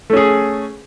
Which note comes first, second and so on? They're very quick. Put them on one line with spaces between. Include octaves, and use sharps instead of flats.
A3 C#4 G#4